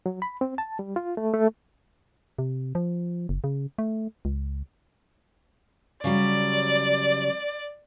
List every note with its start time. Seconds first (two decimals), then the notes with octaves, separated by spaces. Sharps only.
0.06 F#3
0.22 B5
0.41 C4
0.58 A5
0.79 G3
0.96 F4
1.17 A3
1.34 A3
2.39 C3
2.75 F3
3.29 F#1
3.44 C#3
3.78 A3
4.25 C#2
6.04 C#3 F#3 G3 D5